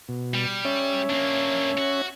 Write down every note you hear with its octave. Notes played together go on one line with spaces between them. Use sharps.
B2
G3
C#4 C#5 E5
A#3 D4
F#4